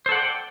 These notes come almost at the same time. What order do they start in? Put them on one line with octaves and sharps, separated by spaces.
C5 A4 F#5 D5 G5